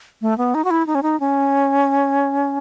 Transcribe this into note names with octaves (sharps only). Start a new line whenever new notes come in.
A3
B3
D#4
F#4
E4
D#4
C#4
D#4
C#4